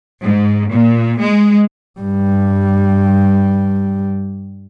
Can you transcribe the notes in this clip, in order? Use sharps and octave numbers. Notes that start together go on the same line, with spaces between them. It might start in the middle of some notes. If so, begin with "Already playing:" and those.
G#2
A#2
G#3
G2 G3